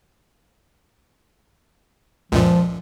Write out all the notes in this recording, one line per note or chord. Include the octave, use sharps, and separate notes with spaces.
C#2 F#2 A#2 F3